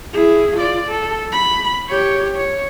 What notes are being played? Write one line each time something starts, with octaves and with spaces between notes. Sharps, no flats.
E4 G#4
F4 D5
A4
B5
G4 C#5
C#5